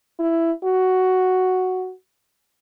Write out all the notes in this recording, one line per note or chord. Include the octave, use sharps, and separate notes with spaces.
E4
F#4